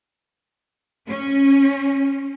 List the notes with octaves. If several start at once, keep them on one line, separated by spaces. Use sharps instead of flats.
C#4